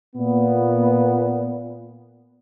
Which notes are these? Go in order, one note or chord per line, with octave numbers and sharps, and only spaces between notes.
A#2 B3